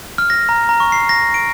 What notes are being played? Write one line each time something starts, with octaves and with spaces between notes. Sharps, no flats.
F6
A#6
A#5
A#5
C#6
C7
A#6
D7